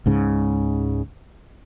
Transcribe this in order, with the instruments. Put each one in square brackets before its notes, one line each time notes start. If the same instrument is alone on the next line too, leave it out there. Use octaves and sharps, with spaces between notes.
[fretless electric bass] C#2 G#2 C#3